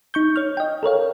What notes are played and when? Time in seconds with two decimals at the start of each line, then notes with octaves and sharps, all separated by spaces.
0.14 D#4 C#6 G6
0.36 C#5 F6
0.57 D#5 G5
0.83 A4 A#4 C#5 F5